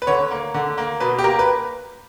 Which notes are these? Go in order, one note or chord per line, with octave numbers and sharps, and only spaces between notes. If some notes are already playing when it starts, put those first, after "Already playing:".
B4
D3 C#5
A#3
D3
A#3
B2 B4
G4
A#3 A#4
B4